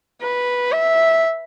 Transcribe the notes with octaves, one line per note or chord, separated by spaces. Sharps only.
B4
E5